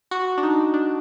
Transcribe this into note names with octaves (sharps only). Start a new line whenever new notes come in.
F#4
D4
D#4
D4